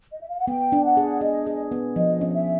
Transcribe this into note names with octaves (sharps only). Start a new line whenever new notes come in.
D#5
E5
F5
F#5
B3 G5
D4
F#5
G#4
G#4 D#5
G#4
B3
F3 D#5
C#4
D#5
E5